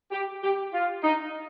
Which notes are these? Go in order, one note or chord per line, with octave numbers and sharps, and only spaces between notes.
G4
G4
F4
D#4